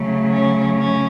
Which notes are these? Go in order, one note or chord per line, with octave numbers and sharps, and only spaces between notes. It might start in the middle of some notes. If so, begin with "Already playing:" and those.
Already playing: C#3 F#3 A3
C#4
C#4